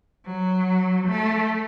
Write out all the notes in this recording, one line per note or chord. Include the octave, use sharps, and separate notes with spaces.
F#3
A3